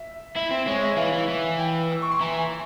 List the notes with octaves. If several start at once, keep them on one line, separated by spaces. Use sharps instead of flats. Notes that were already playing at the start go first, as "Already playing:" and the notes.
Already playing: E5
E4 E5
C4
G#3 C#5
E5
E3 F5
E3
E3
G5
E6
C#6
C6
E3 A#5
G#5